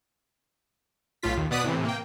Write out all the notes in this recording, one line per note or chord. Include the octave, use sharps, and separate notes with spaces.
B1 A2 F4 B6
D#2 D#3
B2 B3 D5 D#6 F#6 B6
A2 C3 E3
A#3 G5